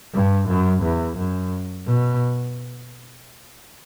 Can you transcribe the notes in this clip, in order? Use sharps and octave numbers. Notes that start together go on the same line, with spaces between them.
G2
F#2
E2
F#2
B2